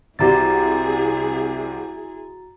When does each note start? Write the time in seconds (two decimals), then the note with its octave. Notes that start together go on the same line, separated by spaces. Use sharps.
0.19 C2 C3 G3 E4 F#4 G#4 A#5 A6